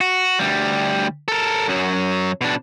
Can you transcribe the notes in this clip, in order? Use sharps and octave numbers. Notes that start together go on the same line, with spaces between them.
F#4
D2 G3
A4 A#4
F#2 F#3
B2 D4